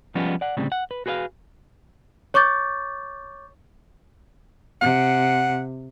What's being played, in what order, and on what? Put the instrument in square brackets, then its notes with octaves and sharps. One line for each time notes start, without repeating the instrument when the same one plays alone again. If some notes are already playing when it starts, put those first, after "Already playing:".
[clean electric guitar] F3 G3 G#3 B3 C#4 F4
D5 F#5
D2 A2 C#3 G3 C4
F#5
B4
F#4 G#4 B4 D#5 F5
[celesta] C#5 C#6 D6 G6 A6
[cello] C3 [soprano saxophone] F#5